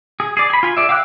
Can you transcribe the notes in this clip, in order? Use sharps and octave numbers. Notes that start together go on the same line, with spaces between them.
G#4
G#4 D5
G#5 B5
F4 G#5
G#4 D5 E5
F5 G5 D6 E6 F#6